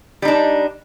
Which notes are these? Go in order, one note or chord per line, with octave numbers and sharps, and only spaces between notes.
G3 D4 D#4